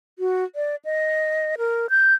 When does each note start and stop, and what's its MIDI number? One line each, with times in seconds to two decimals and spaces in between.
0.19 0.44 66
0.56 0.76 74
0.85 1.55 75
1.58 1.87 70
1.90 2.14 91